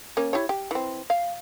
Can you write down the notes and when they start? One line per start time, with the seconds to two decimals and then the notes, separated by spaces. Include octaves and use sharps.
0.17 A#3 C#4
0.33 E4 G4 C#5
0.49 G4
0.71 E3 C4
1.10 F5